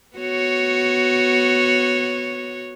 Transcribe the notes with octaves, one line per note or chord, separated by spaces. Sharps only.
B3 F#4 C#5